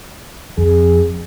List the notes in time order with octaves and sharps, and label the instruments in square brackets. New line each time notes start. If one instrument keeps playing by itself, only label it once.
[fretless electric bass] F2 [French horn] G#4